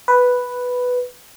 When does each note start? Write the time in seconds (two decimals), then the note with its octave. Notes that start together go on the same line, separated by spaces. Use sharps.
0.08 B4